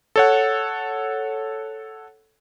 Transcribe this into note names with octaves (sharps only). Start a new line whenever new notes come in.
A4 C#5 F#5